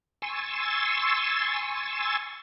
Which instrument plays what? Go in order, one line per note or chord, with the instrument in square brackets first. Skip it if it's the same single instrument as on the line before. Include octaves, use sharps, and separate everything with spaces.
[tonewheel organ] G#5 C6 C#6 E6 A6